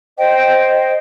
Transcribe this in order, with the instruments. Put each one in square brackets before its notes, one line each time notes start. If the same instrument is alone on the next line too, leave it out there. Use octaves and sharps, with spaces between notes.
[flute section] C5 D#5 G5